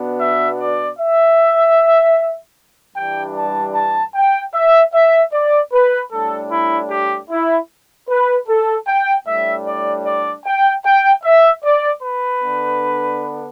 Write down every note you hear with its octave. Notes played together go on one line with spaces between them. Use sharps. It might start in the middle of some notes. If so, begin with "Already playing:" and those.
Already playing: B2 B3 D4
E5
D5
E5
G2 E3 G3 D4 G5
A5
A5
G5
E5
E5
D5
B4
A2 G3 D4 A4
E4
G4
E4
B4
A4
G5
A2 G3 D4 E5
D5
D5
G5
G5
E5
D5
B4
D3 B3 D4